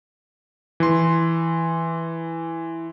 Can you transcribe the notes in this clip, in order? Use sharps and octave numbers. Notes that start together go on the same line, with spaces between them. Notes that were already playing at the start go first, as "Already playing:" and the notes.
E3 C6